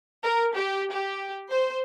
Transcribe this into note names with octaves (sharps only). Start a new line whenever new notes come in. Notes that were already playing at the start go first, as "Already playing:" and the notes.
A#4
G4
G4
C5